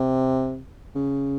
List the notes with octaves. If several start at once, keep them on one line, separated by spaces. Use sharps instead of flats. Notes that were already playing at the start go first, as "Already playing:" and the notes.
Already playing: C3
C#3